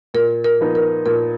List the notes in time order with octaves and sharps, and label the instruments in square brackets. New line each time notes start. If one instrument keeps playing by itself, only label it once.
[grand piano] A#2 [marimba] A#4
[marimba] A#4
[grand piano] F3 B3 D#4
[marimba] A#4
[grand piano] A#2 [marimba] A#4